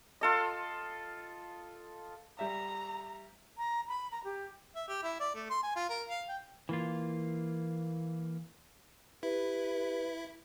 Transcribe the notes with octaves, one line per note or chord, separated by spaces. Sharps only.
F4 A4 D#5
G3 E5 A#5
A#5
B5
A#5
G4
E5
G4
E4
D5
A3
C6
G#5
F4
A#4
F5
G5
E3 A#3 F4
E4 G4 B4